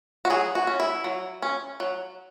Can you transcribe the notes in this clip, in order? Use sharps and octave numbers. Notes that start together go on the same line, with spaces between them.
F#4
F#3 G#4
F#4
C#4
E4
F#3
C#4
F#3